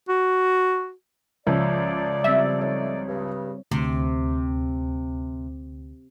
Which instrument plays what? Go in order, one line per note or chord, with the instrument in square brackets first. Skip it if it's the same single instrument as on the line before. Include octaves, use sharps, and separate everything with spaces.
[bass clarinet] F#4
[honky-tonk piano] C#2 F3 [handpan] F4 C#5 E5 [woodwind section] D5
[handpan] G3 C4 [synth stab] E5
[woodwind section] A3 D#4 D5 [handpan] C#5
[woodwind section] G2 C#3
[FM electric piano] D2 [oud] C3